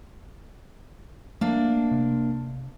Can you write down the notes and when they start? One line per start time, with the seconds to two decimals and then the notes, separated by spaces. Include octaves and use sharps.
1.41 A3 A#3 D4
1.91 C3